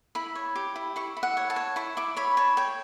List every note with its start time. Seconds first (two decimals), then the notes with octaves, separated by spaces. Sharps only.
0.15 E4 B5
0.35 C#5
0.55 G4
0.76 E4
0.96 E4 C#6
1.17 E4
1.23 F#5
1.37 C#5
1.50 A5
1.56 C#5
1.76 E4 C#6
1.97 E4 D6
2.17 C#5 B5
2.37 C#5 A5
2.57 C#5 G5